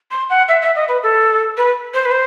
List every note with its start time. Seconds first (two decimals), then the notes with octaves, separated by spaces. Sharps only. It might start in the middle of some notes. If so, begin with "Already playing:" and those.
0.11 C6
0.30 F#5
0.48 E5
0.62 E5
0.75 D#5
0.88 B4
1.03 A4
1.57 B4
1.94 C5
2.05 B4
2.11 C5